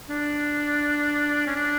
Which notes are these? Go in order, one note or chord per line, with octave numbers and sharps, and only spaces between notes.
D4
C#4
D4